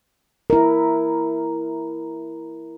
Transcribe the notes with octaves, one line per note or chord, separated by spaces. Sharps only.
E4 A#4